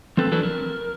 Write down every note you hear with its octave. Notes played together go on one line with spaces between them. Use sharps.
F3 C4 A4 B4
E3 F#3 D4 A4 B4
A#4